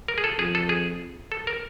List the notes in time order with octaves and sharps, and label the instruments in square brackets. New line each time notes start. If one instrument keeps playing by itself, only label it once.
[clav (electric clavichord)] A#4
G#4
A4
[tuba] F2 [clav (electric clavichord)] G#4
[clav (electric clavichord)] A4
G#4
A4
A#4